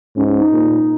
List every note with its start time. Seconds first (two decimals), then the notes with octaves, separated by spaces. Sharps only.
0.16 G#2 C#4
0.29 C#4
0.40 D#4
0.52 A#2